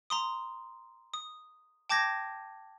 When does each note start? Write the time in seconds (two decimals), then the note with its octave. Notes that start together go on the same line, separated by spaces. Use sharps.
0.10 A#5 C6 D#6
1.14 D#6
1.89 G5 A5 D6 G6 G#6 A#6